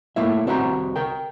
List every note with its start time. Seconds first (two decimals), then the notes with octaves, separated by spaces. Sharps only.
0.16 A3 A#3 E4 E5
0.46 C2 C4 F#4 F#5 A#5
0.96 A#4 G5